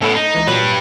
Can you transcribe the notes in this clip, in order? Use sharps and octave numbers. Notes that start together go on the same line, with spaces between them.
A2 A3 B3 C#4 A4
D#4
C#2 E3
A#2 F#3 G3 B4 E7